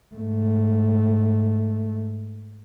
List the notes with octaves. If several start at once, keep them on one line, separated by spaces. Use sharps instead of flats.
G#2 A3